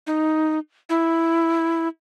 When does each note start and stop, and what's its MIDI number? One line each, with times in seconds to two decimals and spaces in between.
0.07 0.59 63
0.90 1.88 64